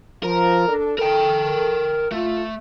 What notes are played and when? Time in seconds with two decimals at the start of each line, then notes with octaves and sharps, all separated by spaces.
0.23 F3 A#4
0.68 D4 A4
0.98 A4 A#4 G5
2.12 A3 F4